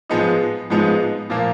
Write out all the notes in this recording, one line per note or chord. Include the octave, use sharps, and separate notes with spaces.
G#2 F3 G#3 B3 D#4
G#2 F3 G#3 B3 D#4
A#2 F3 A#3